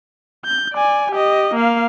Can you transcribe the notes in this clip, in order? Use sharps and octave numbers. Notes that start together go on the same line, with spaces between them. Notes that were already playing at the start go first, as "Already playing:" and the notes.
G6
D5 G#5
G4 D#5
A#3 F5